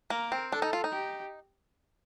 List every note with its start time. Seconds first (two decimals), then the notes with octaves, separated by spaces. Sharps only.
0.10 A#3 A#4
0.32 C4
0.52 D4 A4
0.62 D#4
0.73 F4
0.84 D#4
0.93 G4